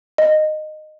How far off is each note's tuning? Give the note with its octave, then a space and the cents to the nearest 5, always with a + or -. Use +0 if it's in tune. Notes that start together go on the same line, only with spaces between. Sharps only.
D#5 -15